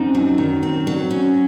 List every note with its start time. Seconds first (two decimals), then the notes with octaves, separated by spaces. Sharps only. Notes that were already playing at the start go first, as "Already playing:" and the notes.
Already playing: F#2 C4 D#4
0.15 F#3
0.38 D#3
0.63 C4
0.87 F#3
1.11 C#4